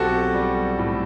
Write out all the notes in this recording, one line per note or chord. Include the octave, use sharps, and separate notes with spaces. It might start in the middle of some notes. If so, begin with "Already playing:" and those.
Already playing: B1 C4 F#4 G4 A4
G3
A2